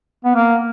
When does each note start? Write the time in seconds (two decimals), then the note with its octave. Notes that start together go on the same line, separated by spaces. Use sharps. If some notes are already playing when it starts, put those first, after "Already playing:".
0.25 B3
0.35 A#3